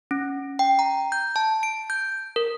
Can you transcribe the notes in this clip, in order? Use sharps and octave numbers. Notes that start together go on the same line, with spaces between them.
C#4
G5
A#5
G6
A5
D7
G6
A#4